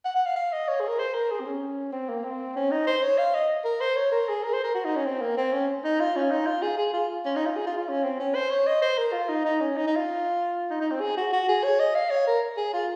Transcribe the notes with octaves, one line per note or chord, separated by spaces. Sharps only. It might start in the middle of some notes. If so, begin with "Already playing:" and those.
F#5
F#5
F5
F5
D#5
C#5
G#4
A#4
C5
A#4
G#4
C4
C#4
C4
A#3
C4
C#4
D#4
C5
C#5
F5
D#5
A#4
C5
C#5
A#4
G#4
A#4
C5
A#4
F#4
D#4
C#4
C4
A#3
C4
C#4
D#4
F4
C#4
D#4
F4
G#4
G#4
F4
C#4
D#4
F4
G#4
F4
F4
C#4
C4
C#4
C5
C#5
D#5
C5
A#4
F4
D#4
D#4
C#4
D#4
D#4
F4
D#4
D#4
C4
G#4
F#4
F#4
G#4
C#5
D#5
F5
C#5
A#4
G#4
F4